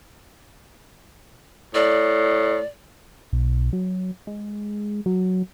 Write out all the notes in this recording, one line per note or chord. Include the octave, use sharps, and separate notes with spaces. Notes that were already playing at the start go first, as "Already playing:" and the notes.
A2 D5
B1
F#3
G#3
F#3